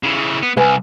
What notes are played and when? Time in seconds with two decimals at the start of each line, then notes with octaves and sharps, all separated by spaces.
0.03 C#3 E3
0.43 B3
0.57 C2 B4 G#5